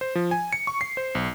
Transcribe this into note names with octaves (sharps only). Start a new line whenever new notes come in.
C5
F3
G#5
C#7
C#6
C7
C5
B1